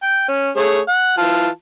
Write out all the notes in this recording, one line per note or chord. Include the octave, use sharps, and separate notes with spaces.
G5
C#4
A3 G#4 C#5
F#5
E3 F4 A5